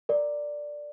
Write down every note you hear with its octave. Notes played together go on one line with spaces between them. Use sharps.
A#4 D5